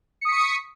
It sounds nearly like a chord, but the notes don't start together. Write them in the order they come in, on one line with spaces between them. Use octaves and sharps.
C#7 D#6 B6 C#6